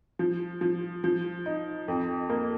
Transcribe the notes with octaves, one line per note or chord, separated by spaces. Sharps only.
F3
F3
F3
D#4
F2
A#3